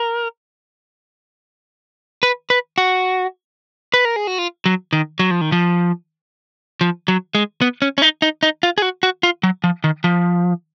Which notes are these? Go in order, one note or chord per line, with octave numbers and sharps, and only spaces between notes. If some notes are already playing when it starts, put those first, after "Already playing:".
Already playing: A#4
B4
B4
F#4
B4
A#4
G#4
F#4
F4
F#3
D#3
F#3
F3
D#3
F3
F3
F#3
G#3
B3
C#4
C#4
D#4
D#4
D#4
F4
G#4
F#4
F#4
F4
F#3
F3
D#3
F3